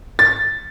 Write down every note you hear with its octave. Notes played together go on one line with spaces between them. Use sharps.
A6